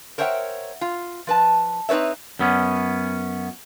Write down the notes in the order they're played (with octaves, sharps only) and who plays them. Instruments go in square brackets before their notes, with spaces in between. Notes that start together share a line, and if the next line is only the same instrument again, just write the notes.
[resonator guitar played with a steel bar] A#4 C5 C#5 E5 F#5 G5
F4
F3 B4 A5
C4 D#4 B4 C#5 E5
[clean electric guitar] F#2 B3 C#4